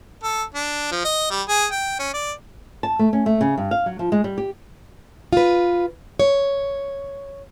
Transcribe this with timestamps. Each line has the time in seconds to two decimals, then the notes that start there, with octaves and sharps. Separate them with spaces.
0.23 A4
0.54 D4
0.91 F3
1.04 D#5
1.30 G3
1.49 G#4
1.72 G5
1.99 C#4
2.13 D5
2.83 A5
2.99 A3
3.13 C#4
3.26 A3
3.41 C#3
3.57 G2
3.71 F5
3.86 F#3
3.99 F3
4.12 G#3
4.24 G3
4.38 G4
5.33 F4 B4
6.19 C#5